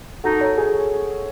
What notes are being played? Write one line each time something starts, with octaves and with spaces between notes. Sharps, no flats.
D#4 F#4 A4
A4 C#5
G#4